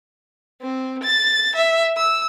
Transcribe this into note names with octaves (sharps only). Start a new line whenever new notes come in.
C4
A6
E5
E6